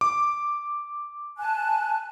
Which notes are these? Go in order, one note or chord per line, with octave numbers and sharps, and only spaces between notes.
D6
G#5 A5 F#6